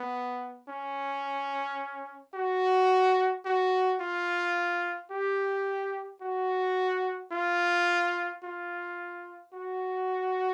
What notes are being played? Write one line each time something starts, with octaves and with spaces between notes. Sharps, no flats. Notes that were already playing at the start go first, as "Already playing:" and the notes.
Already playing: B3
C#4
F#4
F#4
F4
G4
F#4
F4
F4
F#4